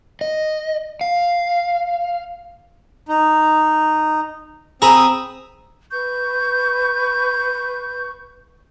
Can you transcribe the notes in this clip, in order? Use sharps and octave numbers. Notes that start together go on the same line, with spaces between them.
D#5
F5
D#4
C4 G#4 A#5 B5 D#6 E6
B4 C#6 G6